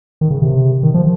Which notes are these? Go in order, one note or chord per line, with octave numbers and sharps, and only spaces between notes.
D#3
C#3
C3
D#3
F3